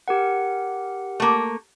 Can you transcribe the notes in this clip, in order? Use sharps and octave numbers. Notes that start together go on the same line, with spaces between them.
G4 A#4 F#5
A3 A#3